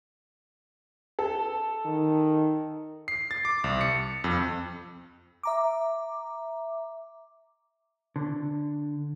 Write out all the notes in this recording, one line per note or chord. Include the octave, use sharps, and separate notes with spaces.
A4
D#3
C7
A6
D6
C2
C#7
F2
E5 A#5 D6
D3